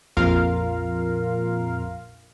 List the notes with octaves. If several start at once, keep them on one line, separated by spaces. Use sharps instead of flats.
A#1 F2 F4 A#4 F5